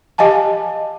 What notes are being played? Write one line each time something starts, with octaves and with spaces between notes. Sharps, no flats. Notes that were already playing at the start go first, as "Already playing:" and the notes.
G4 D#5 F5 G#5 A5